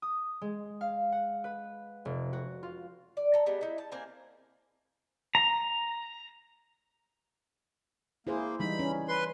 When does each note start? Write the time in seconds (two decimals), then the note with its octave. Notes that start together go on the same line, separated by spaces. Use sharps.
0.02 D#6
0.41 G#3
0.81 F5
1.12 F#5
1.44 B4
2.05 F1
2.33 F#4
2.63 F4
3.17 D5
3.34 A4 A#5
3.46 G3 G#3 B3
3.61 D#4 E4
3.78 A5
3.92 A#3 C4 A#4 G#5
5.35 A#5
8.27 A#3 E4 G#4 C5
8.60 E3 G3 D#4 B5
8.79 C#4
9.08 B4 C6